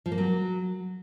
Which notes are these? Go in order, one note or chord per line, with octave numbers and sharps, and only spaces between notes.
F3
A#3
F#3